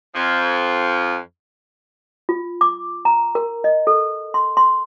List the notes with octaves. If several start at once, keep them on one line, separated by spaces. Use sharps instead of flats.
F2 F3
F4
D6
A#5
A#4
D#5
A4
C6
C6